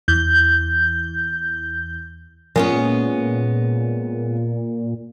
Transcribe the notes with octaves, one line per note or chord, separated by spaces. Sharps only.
E2 G6
A#2 G#3 B3 C#4